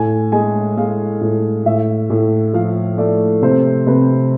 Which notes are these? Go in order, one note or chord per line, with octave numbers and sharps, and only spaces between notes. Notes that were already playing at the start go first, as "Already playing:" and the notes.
Already playing: A2 G#5
G#3 G#5
G#3 F5
A2
A2 E5
A2
F3 F5
A3 D5
C3 C5
C3 B4